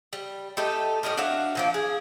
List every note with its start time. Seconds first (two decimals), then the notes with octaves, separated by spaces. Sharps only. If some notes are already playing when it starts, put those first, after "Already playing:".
0.13 G3
0.57 A3 D#4 G4 A4
1.03 A2 G3 D#4 A#4
1.17 D4 F#4 E5 F5
1.55 A#2 F3 A#3
1.74 G#4